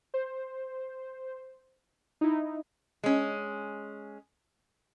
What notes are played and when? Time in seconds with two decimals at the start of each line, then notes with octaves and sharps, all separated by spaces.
0.14 C5
2.21 D#4 E4
3.04 G#3 C#4